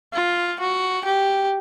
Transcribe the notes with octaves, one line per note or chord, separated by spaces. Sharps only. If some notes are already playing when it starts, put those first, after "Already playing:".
F4
F#4
G4